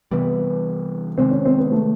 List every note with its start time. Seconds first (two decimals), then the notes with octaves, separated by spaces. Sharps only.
0.11 C3 E3 G3 B3
1.18 C3 D#3 G#3 C4
1.31 C#4
1.45 C4
1.59 B3
1.72 A3